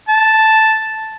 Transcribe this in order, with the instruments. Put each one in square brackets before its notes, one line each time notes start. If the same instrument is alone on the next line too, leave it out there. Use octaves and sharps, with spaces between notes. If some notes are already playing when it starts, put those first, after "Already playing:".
[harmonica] A5